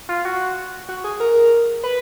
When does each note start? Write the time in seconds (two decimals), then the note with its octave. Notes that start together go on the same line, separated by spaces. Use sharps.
0.09 F4
0.25 F#4
0.89 F#4
1.04 G#4
1.20 A#4
1.84 B4